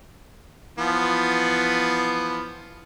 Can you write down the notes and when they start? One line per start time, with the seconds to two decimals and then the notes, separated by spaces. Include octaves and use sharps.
0.78 E3 F3 B3